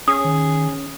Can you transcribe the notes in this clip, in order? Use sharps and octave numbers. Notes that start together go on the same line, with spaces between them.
C#4 G#4 D#6
D#3